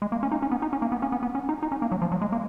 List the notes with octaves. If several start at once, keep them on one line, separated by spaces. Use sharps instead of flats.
G#3
A#3
C#4
D#4
C#4
B3
D#4
C#4
A#3
B3
C#4
B3
B3
C#4
D#4
D#4
C#4
A#3
F#3
F3
F#3
G#3
A#3